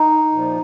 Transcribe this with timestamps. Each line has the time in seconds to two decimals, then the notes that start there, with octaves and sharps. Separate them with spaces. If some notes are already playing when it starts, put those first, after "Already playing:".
Already playing: D#4
0.32 A#2 F3